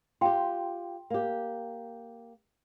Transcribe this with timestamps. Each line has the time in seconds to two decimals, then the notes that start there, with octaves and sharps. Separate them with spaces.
0.21 F4 G4 G5 C6
1.10 A#3 G4